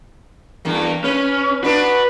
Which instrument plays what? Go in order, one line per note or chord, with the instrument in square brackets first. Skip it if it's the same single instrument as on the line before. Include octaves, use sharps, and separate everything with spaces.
[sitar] E2 G2 A#3
[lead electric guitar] C#4 [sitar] B4
[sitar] B3 D4 F#4 [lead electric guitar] B4